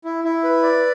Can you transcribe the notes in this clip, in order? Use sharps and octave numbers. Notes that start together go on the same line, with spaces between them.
E4
E4
B4
D5